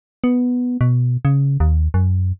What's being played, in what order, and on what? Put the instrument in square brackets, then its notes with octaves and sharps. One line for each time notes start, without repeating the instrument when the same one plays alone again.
[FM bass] B3
B2
C#3
D#2
F#2